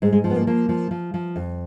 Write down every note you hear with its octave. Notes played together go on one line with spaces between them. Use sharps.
G#2 G#3
G#3
F3
B3
A#3
F3 A#3
F3
F3
F3
F2